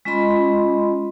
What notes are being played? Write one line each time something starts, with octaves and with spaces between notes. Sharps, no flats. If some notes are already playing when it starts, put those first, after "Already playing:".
G#3 C#4 F4 D#5 B5 C6